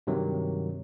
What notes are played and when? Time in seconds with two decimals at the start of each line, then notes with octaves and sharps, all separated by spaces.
0.07 G2 C3 D#3 F#3